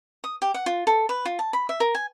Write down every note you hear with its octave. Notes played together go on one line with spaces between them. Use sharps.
D#6
G4
F#5
F4
A4
B4
F4
A5
B5
E5
A#4
G#5